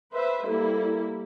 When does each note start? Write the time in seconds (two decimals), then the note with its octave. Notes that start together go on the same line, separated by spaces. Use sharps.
0.12 B4 C5 E5
0.45 G3 A#3 E4 A4